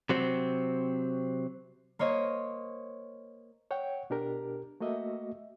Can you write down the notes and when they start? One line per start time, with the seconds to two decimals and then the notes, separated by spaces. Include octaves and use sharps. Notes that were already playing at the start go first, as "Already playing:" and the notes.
0.09 C3 F#3 C4
1.99 A#3 C5 C#5 D#5
3.71 C#5 F#5 G5
4.10 B2 D4 G4 A#4
4.80 A3 A#3 F#4 D#5 E5